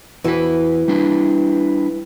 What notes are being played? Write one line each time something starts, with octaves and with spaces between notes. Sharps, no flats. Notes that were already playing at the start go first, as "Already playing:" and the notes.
E2 E3 F#4 B4
G3 D4 E4